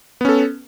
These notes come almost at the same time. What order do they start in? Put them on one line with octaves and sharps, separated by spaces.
B3 C#4 A4